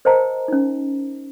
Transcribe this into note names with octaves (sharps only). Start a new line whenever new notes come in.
A#4 C5 D#5 G5 A5 A#5
C#4 D#4